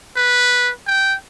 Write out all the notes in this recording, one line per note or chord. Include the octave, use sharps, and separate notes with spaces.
B4
G5